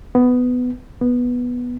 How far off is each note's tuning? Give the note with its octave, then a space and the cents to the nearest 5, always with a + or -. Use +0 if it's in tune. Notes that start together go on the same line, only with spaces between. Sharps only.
B3 +10
B3 -10